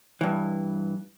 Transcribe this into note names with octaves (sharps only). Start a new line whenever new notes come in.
G2 E3